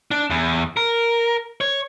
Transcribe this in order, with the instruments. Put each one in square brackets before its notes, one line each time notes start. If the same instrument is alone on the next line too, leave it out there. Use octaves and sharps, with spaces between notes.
[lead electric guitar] D4
E2
A#4
C#5